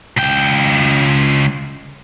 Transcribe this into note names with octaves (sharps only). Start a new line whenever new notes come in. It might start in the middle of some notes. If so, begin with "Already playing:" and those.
C#2 G5